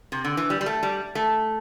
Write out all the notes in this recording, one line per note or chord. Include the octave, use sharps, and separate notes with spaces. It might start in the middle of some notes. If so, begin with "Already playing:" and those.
C3
D3
E3
G3
G3
A3
G3
A3